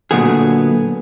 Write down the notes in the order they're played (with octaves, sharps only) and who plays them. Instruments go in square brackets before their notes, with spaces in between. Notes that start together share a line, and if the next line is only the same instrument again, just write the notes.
[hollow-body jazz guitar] A#2 D3 F#3 A3 B3 G#4